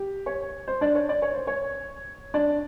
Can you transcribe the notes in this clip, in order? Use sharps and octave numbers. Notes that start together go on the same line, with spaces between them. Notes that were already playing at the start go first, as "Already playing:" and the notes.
Already playing: G4
C#5
C5
D4 D5
C#5
D5
C#5
C5
C#5
D4 D5